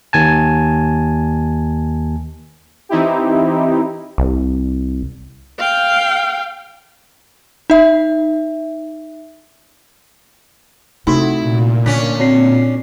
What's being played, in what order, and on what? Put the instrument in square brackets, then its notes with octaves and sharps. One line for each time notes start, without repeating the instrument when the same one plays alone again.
[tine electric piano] D#2 G#5 A5
[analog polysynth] E3 C4 D#4 E4 G4
[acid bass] C2
[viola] F5 G5
[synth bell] D#4 E5
[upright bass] C3 [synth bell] A3 D#4 F#4 [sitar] E4
[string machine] A#2
[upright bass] D3 [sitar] C#4 D4 [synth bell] B6
[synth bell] C4 C#5 C7